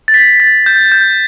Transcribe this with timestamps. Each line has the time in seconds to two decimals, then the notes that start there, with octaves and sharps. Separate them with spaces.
0.08 A6
0.14 B6
0.40 A6
0.66 G6
0.92 G6